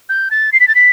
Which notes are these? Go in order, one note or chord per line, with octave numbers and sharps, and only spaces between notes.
G6
A6
C7
B6
A6
B6